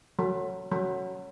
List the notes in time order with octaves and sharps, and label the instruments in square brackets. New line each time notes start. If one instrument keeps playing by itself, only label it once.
[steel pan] F#3
F#3